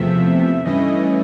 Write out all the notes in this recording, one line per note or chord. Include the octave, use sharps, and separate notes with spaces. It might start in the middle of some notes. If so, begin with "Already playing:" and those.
Already playing: E2 C3 F3 A3 E5
G2 E3 A3 C#4 E4 D#5